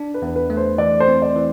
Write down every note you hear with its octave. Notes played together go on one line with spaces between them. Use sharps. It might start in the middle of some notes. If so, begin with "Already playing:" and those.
Already playing: D4
B4
E2
B4
A3
C5
E3 D5
C5
C4
D5
E3